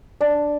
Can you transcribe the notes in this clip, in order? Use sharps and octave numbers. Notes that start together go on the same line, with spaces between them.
D4